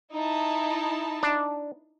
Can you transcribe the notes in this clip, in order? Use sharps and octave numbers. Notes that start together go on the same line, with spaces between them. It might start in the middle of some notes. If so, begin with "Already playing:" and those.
D#4 E4 A5
D4